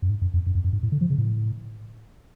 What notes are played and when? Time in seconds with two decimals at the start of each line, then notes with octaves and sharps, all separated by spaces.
0.02 F#2
0.10 G#2
0.22 F#2
0.34 F2
0.46 F#2
0.55 F2
0.64 F#2
0.73 G#2
0.83 A2
0.92 D3
1.01 F3
1.10 C#3
1.18 A2